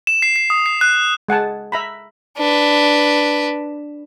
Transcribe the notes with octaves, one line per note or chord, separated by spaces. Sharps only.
E7
C7
C7
D#6
C7
F#6
G#3 F#5 G#5 A5
E5 A#5 B5
D4 B4